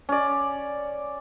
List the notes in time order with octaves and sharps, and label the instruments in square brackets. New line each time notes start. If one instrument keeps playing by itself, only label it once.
[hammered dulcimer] C#4 D5